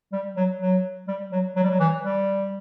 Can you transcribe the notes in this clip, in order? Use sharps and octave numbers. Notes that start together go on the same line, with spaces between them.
G3
F#3
F#3
G3
F#3
F#3
G3
F#3
E3
G3